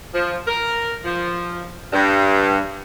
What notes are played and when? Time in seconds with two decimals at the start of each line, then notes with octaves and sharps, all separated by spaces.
0.14 F3
0.47 A#4
1.05 F3
1.93 G2